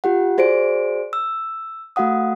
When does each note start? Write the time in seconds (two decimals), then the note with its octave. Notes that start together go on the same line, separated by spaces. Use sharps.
0.04 F4 G4 F#5
0.38 F#4 G#4 C5 D5 D7
1.13 E6
1.96 A3 F#4 F5 F#5 D#6